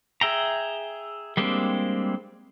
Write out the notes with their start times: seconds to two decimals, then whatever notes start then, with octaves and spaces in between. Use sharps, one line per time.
0.21 G#4 E5 G5 A#5
1.37 G3 G#3 A#3 C4 D4